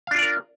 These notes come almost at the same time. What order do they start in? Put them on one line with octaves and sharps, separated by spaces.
F5 D4 F4 D5 A#4